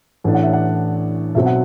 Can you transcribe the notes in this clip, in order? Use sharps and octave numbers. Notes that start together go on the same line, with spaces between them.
A1 A2 E3 A3 D4
F#5
E5
D5 F#5
B1 B2 F#3 C4 E5
F#5